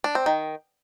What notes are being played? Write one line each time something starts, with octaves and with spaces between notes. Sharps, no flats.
D4
C4
D#3